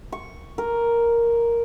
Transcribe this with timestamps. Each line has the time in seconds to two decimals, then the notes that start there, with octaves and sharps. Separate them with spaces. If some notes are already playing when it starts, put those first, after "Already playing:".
0.12 C#6
0.58 A#4